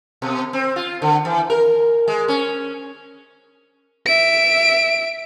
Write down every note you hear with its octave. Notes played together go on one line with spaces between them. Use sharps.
B2
C4
F4
D3
E3
A#4
G#3
C#4
E5 D7